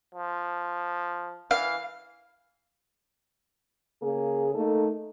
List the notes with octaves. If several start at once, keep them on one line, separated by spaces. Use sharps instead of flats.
F3
E3 F5
C#3 A#3 G#4
A3 A#3 D#4 A4